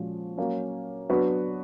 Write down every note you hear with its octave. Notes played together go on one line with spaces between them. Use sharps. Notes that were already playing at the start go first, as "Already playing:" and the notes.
Already playing: A#2 F3 G#3 C#4 F#4
F#3 A#3 C#4
F#3 B3 D4 F#4 B4